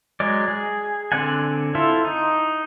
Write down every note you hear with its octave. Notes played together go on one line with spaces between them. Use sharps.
F#3 G#3 D5
G#4
D3 C4 D5 F#5 G#5
E4 F4 A4 C5 E5
D#4